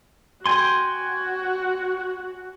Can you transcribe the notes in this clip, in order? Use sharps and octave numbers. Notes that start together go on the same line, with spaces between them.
F#4 G5 G#5 C6